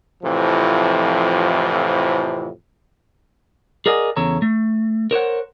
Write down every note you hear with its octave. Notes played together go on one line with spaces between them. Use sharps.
F2 A2 C3 E3 F3
G#4 A#4 D5 D#5 F#5 G#5
E2 C#3 A4 C#5 A#5
A3
A#4 C5 C#5 F#5